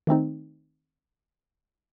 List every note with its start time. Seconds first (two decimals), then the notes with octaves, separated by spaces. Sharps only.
0.07 D#3 A3 C4 D#4